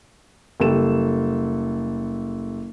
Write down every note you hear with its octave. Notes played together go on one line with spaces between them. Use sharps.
F#1 G3 A4 E7